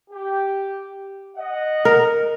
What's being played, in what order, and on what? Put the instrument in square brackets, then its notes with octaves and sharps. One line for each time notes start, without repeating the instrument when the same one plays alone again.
[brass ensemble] G4
D#5 F#5
[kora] A#4